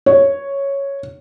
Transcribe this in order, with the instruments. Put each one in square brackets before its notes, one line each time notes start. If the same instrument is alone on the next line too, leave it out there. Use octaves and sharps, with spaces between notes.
[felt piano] C#5